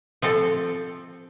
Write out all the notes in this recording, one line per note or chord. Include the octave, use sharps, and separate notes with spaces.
F3 C4 A4